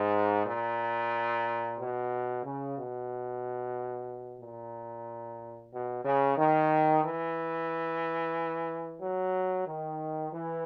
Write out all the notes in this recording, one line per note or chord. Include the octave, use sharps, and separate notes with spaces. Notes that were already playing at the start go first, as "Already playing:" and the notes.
Already playing: G#2
A#2
B2
C#3
B2
A#2
B2
C#3
D#3
E3
F#3
D#3
E3